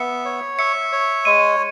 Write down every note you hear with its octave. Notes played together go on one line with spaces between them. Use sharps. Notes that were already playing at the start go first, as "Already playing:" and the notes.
Already playing: B3 E5 C#7
C#5
E5 C#7
C#5
G#3 D#7